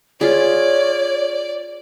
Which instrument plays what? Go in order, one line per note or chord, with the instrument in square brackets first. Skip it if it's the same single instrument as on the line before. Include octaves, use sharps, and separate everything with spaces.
[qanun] F4 G#4 [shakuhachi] C#5 [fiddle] D5